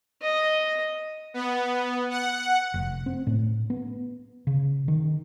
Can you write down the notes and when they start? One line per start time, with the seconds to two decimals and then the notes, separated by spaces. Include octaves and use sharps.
0.22 D#5
1.34 B3
2.10 F#5
2.74 F1
3.06 C4
3.27 A2
3.70 B3
4.47 C#3
4.88 D#3